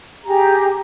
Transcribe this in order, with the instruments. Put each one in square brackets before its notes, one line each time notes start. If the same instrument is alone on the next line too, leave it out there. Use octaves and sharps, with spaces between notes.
[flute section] G4 G#4 A#5